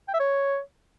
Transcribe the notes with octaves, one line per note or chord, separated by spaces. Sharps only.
G5
E5
C#5